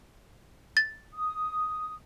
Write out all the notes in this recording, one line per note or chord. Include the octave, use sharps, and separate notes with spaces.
A6
D#6